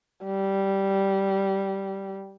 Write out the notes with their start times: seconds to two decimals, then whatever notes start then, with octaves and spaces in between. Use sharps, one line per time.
0.25 G3